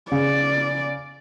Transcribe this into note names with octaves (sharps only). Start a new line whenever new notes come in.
C#3 D5